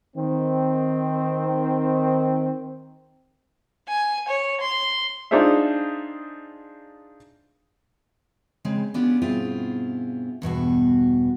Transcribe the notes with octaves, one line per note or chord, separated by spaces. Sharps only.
D#3 C4
G#5
C#5
C6
D4 D#4 F4 G#4 C5 E5
C#3 G#3 C4
B3 C#4 D4 F4 G4 G#4
G2 B2 C4 E4 F4 G#4
E2 G2 B2 F#4